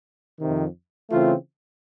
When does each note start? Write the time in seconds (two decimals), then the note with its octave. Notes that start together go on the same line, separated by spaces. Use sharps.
0.40 F2 C3 D#3
1.09 C#3 E3 A3 C4 F4